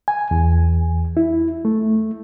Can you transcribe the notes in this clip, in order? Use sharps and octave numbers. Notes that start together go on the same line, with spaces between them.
G#5
E2
E4
A3